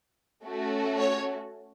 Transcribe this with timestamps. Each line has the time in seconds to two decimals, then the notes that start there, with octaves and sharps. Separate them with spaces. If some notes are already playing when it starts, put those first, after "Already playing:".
0.44 A3 C#4 F#4 A4
0.98 C#5